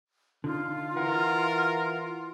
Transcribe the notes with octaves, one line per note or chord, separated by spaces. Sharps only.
D3 D#4 F4
E3 A#4 F#5